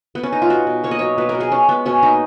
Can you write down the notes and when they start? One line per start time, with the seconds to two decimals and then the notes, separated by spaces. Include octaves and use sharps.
0.15 B3
0.23 C#4
0.33 D#4
0.42 F4
0.50 B2 F#4
0.67 B2
0.83 A#3 C#5
0.91 D#5
0.99 F#3 C#5
1.18 B2 B4
1.29 A#4
1.35 B2
1.40 G#4
1.52 B3 C#4
1.69 G#3 B3
1.85 B2 C#4
2.03 A#3 D#4